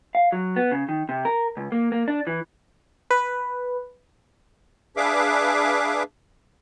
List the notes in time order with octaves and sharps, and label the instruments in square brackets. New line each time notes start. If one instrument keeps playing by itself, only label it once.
[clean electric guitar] F5
F#3
B3
C#3
D#3
C3
A#4
C#2
A#3
A#3
D4
E3
[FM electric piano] B4
[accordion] D4 G#4 B4 E5 F5 D6